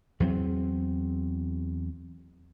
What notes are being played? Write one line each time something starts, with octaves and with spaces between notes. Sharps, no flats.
E2 F#3 G#3 C4